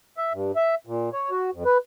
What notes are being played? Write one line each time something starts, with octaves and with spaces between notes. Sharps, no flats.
E5
G2
E5
A#2
C#5
F#4
F2
B4